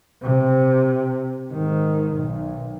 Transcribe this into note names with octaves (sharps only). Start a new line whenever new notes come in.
C3
G#2 D#3
B1